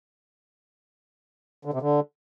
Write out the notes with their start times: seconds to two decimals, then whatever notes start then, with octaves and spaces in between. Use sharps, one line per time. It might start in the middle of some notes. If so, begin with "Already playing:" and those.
1.65 D3
1.73 C3
1.82 D3